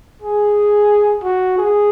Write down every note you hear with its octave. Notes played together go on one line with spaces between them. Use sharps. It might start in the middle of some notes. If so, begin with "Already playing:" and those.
G#4
F#4
G#4